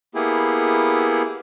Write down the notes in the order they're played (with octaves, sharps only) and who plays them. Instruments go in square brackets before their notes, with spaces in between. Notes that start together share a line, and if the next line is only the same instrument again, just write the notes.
[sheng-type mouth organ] A#3 B3 E4 G4 G#4